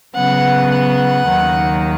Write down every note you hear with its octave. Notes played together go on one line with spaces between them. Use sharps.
C#3 F#3 B3 F#5
F#5
D#2 D#3 F#3